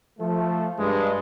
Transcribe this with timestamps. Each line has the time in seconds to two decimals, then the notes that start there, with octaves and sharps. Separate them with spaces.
0.19 F3 A3
0.79 G2 G#3